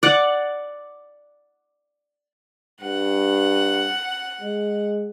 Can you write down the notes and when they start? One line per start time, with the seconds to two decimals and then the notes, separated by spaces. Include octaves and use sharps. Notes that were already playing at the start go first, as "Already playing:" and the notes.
0.03 D5 F#5
2.81 G2 F#5
4.41 G#3